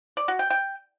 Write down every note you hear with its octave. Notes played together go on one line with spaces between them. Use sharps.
D5
F#4
G5
G5